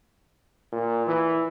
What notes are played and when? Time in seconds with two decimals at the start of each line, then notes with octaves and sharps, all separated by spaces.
0.72 A#2
1.07 E3